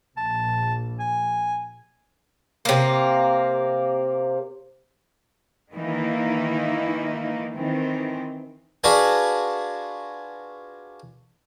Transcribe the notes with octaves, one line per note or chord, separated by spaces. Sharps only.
A#1 A5
G#5
C3 A#3
D#3 E3 A#3 D#4 E4
D#3 E3 C4
D4 F4 F#4 G#4 B4 A5